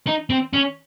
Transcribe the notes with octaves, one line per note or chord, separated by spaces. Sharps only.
D#4
C4
C#4